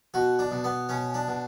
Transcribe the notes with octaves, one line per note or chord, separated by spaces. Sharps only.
B2 F#4
D4
B2
B3
B2 C#4
D4
B2